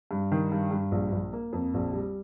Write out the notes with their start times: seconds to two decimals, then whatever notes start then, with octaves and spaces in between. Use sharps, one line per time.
0.11 G2
0.32 D#3
0.52 G2
0.71 G2
0.91 A#1
1.12 A#1
1.33 A#3
1.53 F2
1.74 A#1
1.93 G3